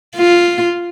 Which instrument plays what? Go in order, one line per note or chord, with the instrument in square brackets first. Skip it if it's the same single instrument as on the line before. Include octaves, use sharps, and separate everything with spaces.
[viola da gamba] F4